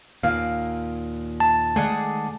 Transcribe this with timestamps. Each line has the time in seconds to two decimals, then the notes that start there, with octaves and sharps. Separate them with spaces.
0.23 D#2 A#2 F5
1.40 A5
1.76 D#3 G#3 A3 G#4 D5 F#5